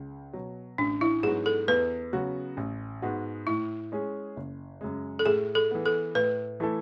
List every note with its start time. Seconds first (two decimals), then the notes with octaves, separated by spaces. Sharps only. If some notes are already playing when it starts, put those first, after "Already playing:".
Already playing: C#2
0.33 B2 F#3
0.78 A1 D4
1.01 E4
1.23 G#2 F#3 B3 F#4 G#4
1.46 A4
1.68 E2 B4
2.13 C#3 F#3 B3 F#4
2.57 A1
3.02 G#2 G#3 B3 F#4
3.47 A2 E4
3.92 G#3 C#4 G#4
4.36 F#1
4.81 F#2 C#3 G#3
5.19 A4
5.25 A2 G#4
5.55 A4
5.71 E3 B3
5.86 A4
6.15 A2 B4
6.60 E3 A3 E4 A4